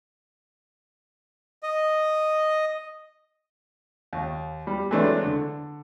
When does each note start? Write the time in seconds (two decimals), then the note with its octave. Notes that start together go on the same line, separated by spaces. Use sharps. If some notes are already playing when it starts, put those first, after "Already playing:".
1.63 D#5
4.13 D#2
4.67 G3
4.91 E3 F#3 G#3 A3 C4 D4
5.23 D3